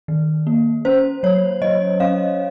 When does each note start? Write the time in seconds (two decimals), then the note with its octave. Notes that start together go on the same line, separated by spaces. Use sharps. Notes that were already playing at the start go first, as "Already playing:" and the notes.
0.08 D#3
0.47 A#3
0.85 C#4 C5
1.23 F#3 C#5
1.62 F#3 D#5
2.00 C#4 F5